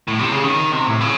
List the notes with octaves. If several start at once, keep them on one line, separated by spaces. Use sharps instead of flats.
A2
C3
C#3
D#3
C3
A2
C#3